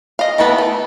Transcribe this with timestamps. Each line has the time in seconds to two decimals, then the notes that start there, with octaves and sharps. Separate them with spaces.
0.19 D#5 F5
0.38 E3 A3 B3 E4 B4
0.58 A3